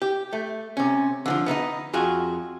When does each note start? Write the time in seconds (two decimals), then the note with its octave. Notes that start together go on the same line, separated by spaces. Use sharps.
0.02 G4
0.33 A3
0.77 C3 C#4
1.26 D3 E3 F3
1.46 B3 D#4 E4 D#5
1.93 F2 F4 F#4 G#4